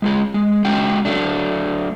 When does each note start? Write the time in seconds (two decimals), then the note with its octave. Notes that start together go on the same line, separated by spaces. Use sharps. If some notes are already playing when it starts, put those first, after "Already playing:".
0.02 G#3 F4 G#4
0.34 G#3
0.65 G#3 C#4 F#4 G5
1.05 F#3 A3 D4